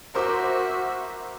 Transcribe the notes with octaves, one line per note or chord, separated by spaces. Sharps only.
F#4 A#4 C5 E5 D6